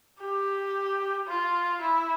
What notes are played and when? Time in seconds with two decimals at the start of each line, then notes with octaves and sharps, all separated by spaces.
0.21 G4
1.27 F4
1.81 E4